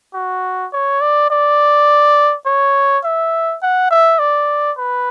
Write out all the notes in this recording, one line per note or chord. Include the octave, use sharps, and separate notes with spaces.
F#4
C#5
D5
D5
C#5
E5
F#5
E5
D5
B4